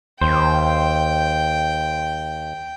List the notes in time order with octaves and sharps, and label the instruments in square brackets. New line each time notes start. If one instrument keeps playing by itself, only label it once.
[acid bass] D#2 [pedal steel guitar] C5 [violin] G5